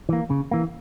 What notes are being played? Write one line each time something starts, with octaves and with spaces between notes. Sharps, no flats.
E3 A#3
C#3
E3 A#3